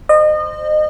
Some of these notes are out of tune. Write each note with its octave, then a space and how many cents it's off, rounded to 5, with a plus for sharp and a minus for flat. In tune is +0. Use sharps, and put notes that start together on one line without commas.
C5 +0 D#5 -30